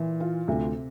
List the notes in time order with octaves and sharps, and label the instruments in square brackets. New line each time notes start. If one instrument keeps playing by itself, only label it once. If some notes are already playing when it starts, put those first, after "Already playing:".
Already playing: [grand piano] A#2 [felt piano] E3
[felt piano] F4
[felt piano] D2 [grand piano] C3